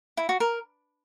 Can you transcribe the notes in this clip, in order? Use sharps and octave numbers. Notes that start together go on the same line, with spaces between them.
E4
F#4
A#4